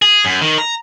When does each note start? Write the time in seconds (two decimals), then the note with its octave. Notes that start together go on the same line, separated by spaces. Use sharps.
0.02 G#4
0.25 F#2
0.41 D#3
0.58 A#5